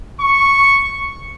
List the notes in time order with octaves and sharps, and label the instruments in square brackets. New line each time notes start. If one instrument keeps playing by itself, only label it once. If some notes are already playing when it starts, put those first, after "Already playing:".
[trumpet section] C#6